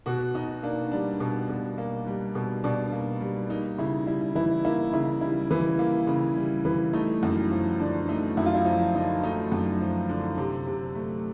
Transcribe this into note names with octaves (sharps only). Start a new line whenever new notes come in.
B2 F#4
B2 D#4
A#3 D4
G3 D4
B2
B2
A#3
G3
B2
B2 D4
A#3
G3
A#3 D#4
C#3 E4
G3 E4
E3 E4
A#3 E4
C#3 E4
G3 E4
E3
A#3
C#3
G3
E3
A3 D#4
F#2
F3
D3 D4
A3 D#4
F#2 E4
F4
E4
F3 D#4
D3 D#4
A3 D#4
F#2
F3
D3
C3
C3
A3